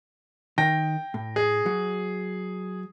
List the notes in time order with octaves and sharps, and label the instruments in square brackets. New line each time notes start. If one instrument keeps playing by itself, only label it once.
[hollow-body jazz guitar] D#3 [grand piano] G5 A#6
[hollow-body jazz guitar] A2
[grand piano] G#4
[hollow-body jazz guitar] F#3